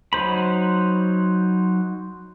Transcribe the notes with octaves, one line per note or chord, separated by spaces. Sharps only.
F#3 D#4 C5 B5